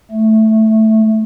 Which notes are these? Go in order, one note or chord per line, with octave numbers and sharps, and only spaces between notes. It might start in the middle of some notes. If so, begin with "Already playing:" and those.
A3